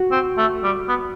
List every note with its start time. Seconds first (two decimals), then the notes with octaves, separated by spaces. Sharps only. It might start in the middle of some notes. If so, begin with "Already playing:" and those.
Already playing: F#4
0.11 C4
0.38 A3
0.63 G3
0.89 B3